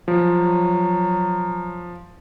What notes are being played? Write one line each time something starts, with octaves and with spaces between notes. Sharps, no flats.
F3 F#3